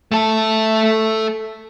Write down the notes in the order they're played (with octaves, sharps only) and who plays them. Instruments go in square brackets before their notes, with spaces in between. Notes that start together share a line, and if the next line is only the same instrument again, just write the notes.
[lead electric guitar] A3 A4